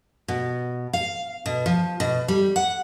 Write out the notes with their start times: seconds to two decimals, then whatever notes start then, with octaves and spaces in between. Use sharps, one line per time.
0.28 B2
0.93 F5
1.46 B2
1.66 F3
2.00 B2
2.28 G3
2.56 F#5